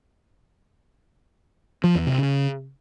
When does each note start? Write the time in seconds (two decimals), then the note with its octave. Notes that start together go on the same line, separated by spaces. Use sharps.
1.84 F3
1.95 E2
2.07 C3
2.18 C#3